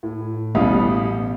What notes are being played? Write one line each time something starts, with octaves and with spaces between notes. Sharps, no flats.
A2
A1 B2 G3 E5 F5 D#6